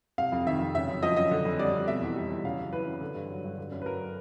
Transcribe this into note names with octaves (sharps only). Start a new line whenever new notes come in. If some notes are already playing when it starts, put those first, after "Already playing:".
C3 F5
F2
D#3 E5
F2
C#3 E5
F#2
F3 D#5
F#2 D#5
D3
F2
G3 D5
F2
B2 E5
E2
G3
E2
C#3 F5
F#2
E3 B4
F#2
D3
G2
F#3
G2
D3
F#2
B4
F#3 A#4